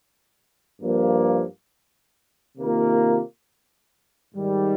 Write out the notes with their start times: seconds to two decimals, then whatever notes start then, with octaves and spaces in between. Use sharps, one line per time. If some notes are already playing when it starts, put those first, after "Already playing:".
0.82 G2 F3 A#3
2.58 C3 D#3 A#3 F4 A#4
4.33 G#2 D#3 G3